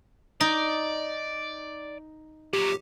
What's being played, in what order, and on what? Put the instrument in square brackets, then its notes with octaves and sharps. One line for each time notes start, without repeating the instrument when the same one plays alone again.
[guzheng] D#4 [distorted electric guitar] D5
[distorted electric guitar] A#2 F#3 [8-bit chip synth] G4